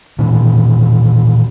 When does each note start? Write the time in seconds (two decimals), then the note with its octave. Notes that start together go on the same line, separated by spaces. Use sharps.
0.19 A#2 D#3 E3